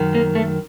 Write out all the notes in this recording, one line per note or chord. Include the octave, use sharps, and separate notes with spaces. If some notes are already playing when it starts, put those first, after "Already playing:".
Already playing: F#2 D#3
A#3
A3